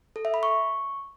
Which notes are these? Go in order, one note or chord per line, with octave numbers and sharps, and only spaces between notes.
A4
E5
B5
C#6